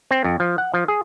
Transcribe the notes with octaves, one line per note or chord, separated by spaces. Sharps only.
C4
F2
F3
F#5
F3
G#4